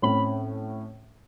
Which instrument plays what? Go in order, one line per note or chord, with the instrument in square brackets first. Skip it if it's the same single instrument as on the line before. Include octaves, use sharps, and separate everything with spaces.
[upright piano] A2 C4 C#4 [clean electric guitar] B5